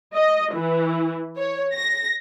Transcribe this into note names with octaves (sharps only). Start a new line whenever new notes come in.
D#5
E3
C#5
A#6